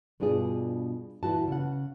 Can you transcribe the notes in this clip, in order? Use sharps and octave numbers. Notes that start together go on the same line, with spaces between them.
G2 B2 D4 F4 G#4
A#2 E3 E4 F#4 A5
C#3 F#5